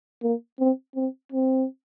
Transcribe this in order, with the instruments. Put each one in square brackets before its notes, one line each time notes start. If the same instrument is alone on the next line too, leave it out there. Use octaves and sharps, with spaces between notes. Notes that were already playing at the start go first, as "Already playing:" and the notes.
[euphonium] A#3
C4
C4
C4